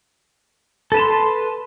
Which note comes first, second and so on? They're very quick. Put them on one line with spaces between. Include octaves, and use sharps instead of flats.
A4 B4 A5 C6